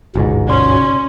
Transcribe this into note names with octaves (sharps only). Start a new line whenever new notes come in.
G1 C#2 G#2 B2
C#4 D5 C6